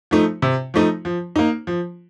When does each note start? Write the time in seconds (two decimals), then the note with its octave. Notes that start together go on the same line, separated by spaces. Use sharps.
0.11 F3 A3 D#4
0.42 C3
0.74 F3 A3 D#4
1.05 F3
1.36 A#3 D#4
1.67 F3